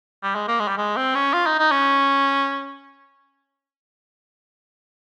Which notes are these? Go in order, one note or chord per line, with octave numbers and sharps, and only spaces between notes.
G3
G#3
A#3
G#3
G3
G#3
C4
C#4
F4
D#4
D#4
C#4